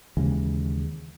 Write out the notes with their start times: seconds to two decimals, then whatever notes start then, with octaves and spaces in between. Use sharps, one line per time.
0.17 D#2 C#3 E3 G#3